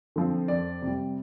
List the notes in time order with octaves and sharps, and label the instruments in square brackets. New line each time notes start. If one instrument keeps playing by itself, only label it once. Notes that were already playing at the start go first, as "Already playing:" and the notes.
[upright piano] D3 F3 C4
F2 D5
C3
G3